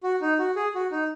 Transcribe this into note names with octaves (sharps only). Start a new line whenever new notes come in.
F#4
D#4
F#4
G#4
F#4
D#4